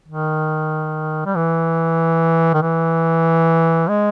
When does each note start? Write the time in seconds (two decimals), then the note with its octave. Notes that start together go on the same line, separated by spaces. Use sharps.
0.08 D#3
1.25 G3
1.35 E3
2.54 D#3
2.62 E3
3.89 G#3